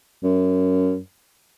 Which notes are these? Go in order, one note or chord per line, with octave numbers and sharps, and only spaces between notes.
F#2